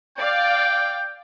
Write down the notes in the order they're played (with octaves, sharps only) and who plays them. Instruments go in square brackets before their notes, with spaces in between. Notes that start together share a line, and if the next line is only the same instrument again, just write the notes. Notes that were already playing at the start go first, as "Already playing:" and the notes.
[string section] D5 F5 [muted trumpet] G5